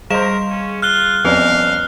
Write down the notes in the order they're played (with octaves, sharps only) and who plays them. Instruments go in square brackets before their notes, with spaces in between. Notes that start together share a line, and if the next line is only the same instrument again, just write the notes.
[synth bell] G3 G#4 F5 [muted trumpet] A#4 [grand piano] C5 D#5 [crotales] E7
[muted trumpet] C#4
[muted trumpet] F4 [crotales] F6 F#6 G7
[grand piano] F2 G3 C#4 [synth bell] F3 B3 B4 [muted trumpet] F5